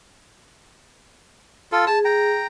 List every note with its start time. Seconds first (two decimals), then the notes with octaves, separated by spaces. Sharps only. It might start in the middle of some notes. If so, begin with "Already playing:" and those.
1.72 F4 A4
1.87 G#4 A5
2.05 G5 A#5